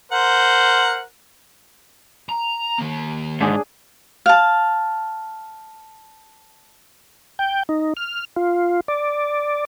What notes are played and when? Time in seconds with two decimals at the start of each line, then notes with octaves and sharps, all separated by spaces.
0.12 A#4 C5 F#5
2.29 A#5
2.79 D#3 A#3
3.40 G#2 D4 G#4
4.26 F5 A5
7.39 G5
7.69 D#4
7.97 F6
8.36 F4
8.88 D5